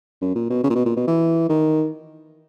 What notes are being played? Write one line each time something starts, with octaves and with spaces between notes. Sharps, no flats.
F#2
A#2
B2
C#3
A#2
B2
A#2
B2
E3
D#3